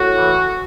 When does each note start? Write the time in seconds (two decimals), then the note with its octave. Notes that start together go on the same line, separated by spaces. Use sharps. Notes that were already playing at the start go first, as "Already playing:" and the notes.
Already playing: A2 F#4
0.15 E3